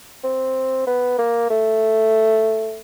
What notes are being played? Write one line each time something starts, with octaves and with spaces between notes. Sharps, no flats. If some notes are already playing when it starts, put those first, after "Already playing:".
C4
B3
A#3
A3